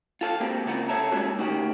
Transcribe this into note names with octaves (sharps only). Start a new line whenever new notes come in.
F4 A4 F5
A#3 C4 F#4 G4
C#2 C#3 E4 F4 A#4 F#5
A4 B4 C#5 E5 A5 A#5
G3 G#3 A#3 C#4 F4 F#4
D2 D#3 F#4 G4